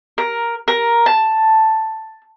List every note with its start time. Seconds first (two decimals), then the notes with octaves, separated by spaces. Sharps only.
0.18 A#4
0.68 A#4
1.06 A5